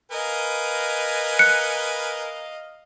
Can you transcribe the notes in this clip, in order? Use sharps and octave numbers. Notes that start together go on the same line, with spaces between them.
A#4 B4 D#5 F5 G#5
F#6 C#7